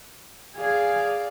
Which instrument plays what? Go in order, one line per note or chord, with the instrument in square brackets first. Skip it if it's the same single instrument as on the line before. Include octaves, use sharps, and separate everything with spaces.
[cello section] G#4 [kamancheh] D5 F5